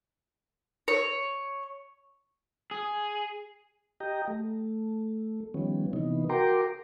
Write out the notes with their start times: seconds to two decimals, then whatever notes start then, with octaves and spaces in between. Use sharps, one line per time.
0.88 C#5
2.71 G#4
4.00 G4 D#5 G5 A#5
4.28 A3
5.54 D#3 F3 G3 B3 C#4
5.93 C3 E3 B3 D#4
6.29 F#4 A#4 G5 A#5 C6 D6